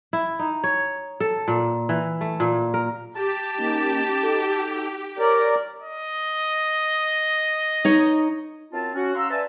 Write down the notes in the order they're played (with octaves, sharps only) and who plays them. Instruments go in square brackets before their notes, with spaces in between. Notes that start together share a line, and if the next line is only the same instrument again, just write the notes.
[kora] E4
D#4
C#5
A4
A#2
E3
A3
A#2
A#4
[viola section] G4 [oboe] A5
[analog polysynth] A#3 C#4 D#4
D#4 A4
[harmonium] A#4 D5 [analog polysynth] C#5
[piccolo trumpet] D#5
[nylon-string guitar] D#4 C#5
[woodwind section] F#2 C4 F4 A5
C#4 F#4
F5 A#5 C6 E6
B4 D5 E5 G#5 A5